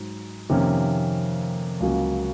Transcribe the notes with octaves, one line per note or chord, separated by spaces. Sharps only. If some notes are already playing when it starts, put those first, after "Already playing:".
Already playing: G#2 F#3
F2 C3 D#3 A#3 C#4
C#2 C#3 F#3 A#3